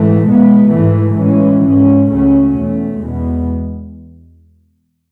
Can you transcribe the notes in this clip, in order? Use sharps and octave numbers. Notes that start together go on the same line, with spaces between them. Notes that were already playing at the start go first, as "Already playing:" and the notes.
Already playing: G#2 E3 A3
B2 G#3 B3
G#2 E3 A3
A2 E3 G#3 C#4
G#2 G#3 C#4
C#2 C#3 F#3 A3 C#4
E2 B2 A3
E2 B2 G#3 B3